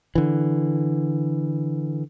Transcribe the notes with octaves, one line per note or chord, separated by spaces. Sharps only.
D3 E3